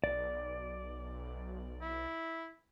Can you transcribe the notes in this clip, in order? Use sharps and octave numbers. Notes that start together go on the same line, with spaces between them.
B1 D5
E4